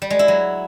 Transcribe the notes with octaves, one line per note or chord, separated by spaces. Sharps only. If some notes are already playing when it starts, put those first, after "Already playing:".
G3
G#3
E4
F#3